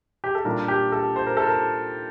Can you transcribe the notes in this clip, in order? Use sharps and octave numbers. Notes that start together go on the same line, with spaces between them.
G4
A4
A#2 G3 D4 F4 A#4
G4
A4
C5
A#4
A4
A#4